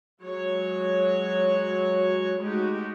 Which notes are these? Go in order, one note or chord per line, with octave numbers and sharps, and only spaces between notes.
F#3 G#3 F#4 C#5
G#3 A3 D#4 F#4 G4